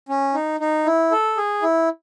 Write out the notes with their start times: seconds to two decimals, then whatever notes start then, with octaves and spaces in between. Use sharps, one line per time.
0.09 C#4
0.34 D#4
0.60 D#4
0.86 E4
1.11 A4
1.37 G#4
1.62 E4